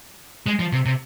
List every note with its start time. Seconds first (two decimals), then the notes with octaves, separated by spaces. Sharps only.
0.46 G#3
0.59 F3
0.72 C3
0.86 C3